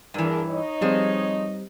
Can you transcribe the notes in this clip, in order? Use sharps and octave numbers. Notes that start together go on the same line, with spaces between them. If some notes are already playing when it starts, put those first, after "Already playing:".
G2 E3 D4 G#4 A#4
D#4 C#5 D#5
F3 G3 C4 G#4 C5